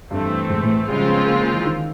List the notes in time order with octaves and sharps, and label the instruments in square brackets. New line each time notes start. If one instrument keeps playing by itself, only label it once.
[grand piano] G2 [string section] E3 A3 C4
[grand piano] G#2
A2
[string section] C#3 F3 G#3 C4 F4 [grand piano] G3
[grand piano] B3
A#3
A#3
E3
D#3